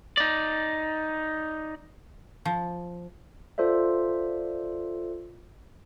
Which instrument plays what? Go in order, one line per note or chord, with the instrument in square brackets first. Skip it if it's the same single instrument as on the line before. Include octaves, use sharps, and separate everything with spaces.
[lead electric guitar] D#4 D5
[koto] F3
[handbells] F4 A4 C5 D5 E5